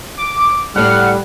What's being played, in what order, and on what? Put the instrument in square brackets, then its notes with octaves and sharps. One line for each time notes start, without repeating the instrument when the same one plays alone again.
[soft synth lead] D6
[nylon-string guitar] A2 A3 D5 [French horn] G3 [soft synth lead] F#5 [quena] F6